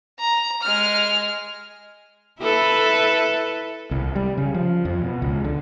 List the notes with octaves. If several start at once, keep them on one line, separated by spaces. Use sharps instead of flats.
A#5
G#3 F6
E4 A4 B4
C2
G3
C#3
F3
F2
B2
C#2
D3